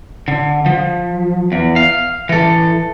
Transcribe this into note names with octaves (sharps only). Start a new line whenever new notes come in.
D3
F3
E2
F5
E3 A4